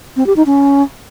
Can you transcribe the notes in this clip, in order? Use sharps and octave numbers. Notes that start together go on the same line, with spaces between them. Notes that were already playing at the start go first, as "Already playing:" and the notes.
C4
G4
D#4
C#4